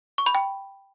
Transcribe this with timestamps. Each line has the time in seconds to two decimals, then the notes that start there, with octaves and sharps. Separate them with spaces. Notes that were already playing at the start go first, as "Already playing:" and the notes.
0.18 C#6
0.26 B5
0.35 G5